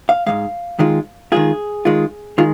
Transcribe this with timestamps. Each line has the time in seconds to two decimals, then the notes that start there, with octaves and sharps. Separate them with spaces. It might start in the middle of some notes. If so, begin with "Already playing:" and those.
0.09 F5
0.26 G#2 F3 G#3 F5
0.79 D#3 G#3 F4
1.32 D#3 G#3 F4 G#4
1.85 D#3 G#3 F4
2.38 D#3 G#3 F4